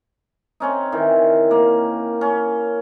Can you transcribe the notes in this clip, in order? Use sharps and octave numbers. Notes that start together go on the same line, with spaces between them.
C4 C#4 D#4
D#3 E3
A#3
C#4